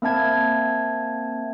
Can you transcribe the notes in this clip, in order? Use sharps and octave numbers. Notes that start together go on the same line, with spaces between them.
A#3 C4 E5 A5 G#6